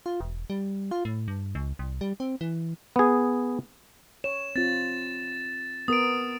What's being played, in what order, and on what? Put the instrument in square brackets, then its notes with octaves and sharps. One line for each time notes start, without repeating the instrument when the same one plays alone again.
[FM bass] F4
E1
G3
F4
A2
G2
C#2
C2
G3
C4
E3
[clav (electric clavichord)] B3 G#4
[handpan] C#5 [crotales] E7
[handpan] C4 F4 [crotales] A6
[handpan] B3 A#4 [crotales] D#6 D7